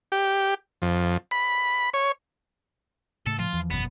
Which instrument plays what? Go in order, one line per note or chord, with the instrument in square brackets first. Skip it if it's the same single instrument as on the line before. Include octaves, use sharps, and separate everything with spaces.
[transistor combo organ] G4
F2
B5
C#5
[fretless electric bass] A2 C#3 A3 [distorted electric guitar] A4
[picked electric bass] F3 [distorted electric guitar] F4
[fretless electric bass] E2 E3
[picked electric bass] F#1 F#2 B2 [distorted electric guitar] B3